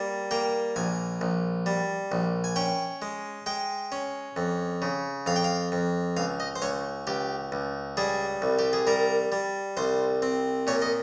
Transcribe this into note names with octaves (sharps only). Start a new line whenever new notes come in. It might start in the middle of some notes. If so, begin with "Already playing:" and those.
Already playing: G3 A#3
A#3 G5
A#1 G#5
A#1
G3
A#1
G#5
C#4 G5
G#3
G#3 G5
C#4
F2
C#3
F2 F5
G5
F5
F2
C#2 F5
D#5
C5
C#2 C#5
C#2 G4
C#2
G3 G#4
C2
G4
G#4
G3 A#4
G3
C2 C5
C4
A#2 C#5
D#5